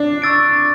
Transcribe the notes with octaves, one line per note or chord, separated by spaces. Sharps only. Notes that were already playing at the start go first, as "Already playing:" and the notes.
Already playing: D4
C#6 E6 A6 D7